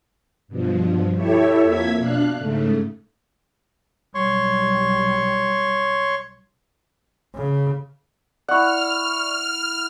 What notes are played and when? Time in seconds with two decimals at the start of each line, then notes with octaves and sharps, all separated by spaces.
0.48 G2 B2 F3
1.15 E4 G4 A4 C#5 E5
1.62 F2 F3 A#3 E5 G#6 B6
1.98 B2 D4 F5 F#6
2.38 G#2 C#3 A3
4.15 B1 G3 C#5 C6 C#6
7.35 C#3
8.48 E4 D5 F#5 C#6 F6